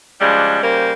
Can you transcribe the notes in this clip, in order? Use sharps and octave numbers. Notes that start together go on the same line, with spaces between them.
C#3 F3 G3 G#3 D4
C#3 G3 A#3 C5